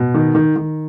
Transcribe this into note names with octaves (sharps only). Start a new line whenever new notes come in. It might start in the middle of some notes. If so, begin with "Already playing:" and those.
Already playing: B2
D#3
D#3
D#3